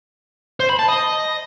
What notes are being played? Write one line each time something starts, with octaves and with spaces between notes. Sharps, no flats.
C5
B5
A5
D#5